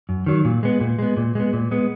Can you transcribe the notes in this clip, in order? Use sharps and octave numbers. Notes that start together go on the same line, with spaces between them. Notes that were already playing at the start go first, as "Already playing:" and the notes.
F#2
D#3 F#3
A#2
G#3 B3
A#2
G#3 B3
A#2
G#3 B3
A#2
G#3 B3